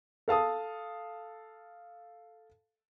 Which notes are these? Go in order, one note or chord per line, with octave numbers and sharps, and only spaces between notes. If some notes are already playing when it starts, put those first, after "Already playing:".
A4 F5 A5 D#6